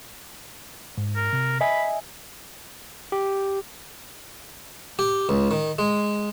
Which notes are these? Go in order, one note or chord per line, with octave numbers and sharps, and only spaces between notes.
G#2
A#4
C3
D#5 E5 G#5 B5
G4
G4
C#2
D#3
G#3